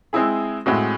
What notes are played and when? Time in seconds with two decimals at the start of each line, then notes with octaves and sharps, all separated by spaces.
0.13 G#3 C4 E4 G#4
0.66 A2 G#3 C4 F#4